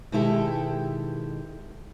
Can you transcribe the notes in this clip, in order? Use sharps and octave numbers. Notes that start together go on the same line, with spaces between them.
B2 D#3 G#3 E4 G4 A4